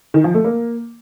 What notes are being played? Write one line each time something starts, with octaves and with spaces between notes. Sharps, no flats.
D#3
F3
A3
A#3